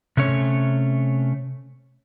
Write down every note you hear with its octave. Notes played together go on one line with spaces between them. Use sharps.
C3 A3 C#4 C#5